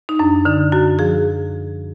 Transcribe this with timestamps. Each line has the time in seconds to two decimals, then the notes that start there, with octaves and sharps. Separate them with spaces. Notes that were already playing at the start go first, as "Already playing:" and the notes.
0.09 D#4
0.19 F#2 D4
0.45 D3 D#4
0.72 F#2 F#4
0.99 F3 G#4